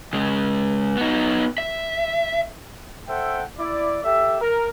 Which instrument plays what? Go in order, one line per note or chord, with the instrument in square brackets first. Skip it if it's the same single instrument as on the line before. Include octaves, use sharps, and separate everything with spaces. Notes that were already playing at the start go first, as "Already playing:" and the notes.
[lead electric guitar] C#3 G#3
B3 D#4
E5
[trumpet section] A4 C5 E5 F#5 G5
E4 D5
G4 A4 E5
A#4